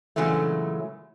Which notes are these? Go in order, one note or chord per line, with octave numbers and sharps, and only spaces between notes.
A#2 C#3 E3 F#3 G#3 A3